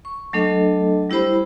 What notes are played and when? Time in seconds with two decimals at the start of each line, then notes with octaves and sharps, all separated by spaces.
0.05 C#6
0.33 F#3 A3 D4 A4 D#5
1.10 G3 E4 G4 C5 B5